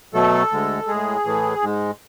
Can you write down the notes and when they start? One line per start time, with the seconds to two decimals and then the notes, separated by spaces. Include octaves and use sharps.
0.14 B2 F#3 A3 A4
0.51 D2 D3 G#3
0.87 A2 G#3 G#4
1.25 A2 E3 A3
1.62 G#2 G#3